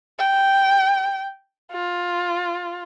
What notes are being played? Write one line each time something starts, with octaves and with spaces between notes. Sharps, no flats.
G5
F4